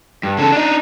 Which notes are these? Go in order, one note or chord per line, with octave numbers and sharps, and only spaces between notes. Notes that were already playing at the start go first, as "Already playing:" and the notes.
G2
C#3 A4
D4 D#4